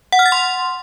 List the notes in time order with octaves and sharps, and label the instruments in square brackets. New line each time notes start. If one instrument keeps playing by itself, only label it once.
[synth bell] F#5
F6
A6
C6